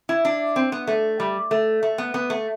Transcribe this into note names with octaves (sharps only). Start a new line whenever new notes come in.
E4
D4
C4
B3
A3
G3
A3
A3
B3
B3
A3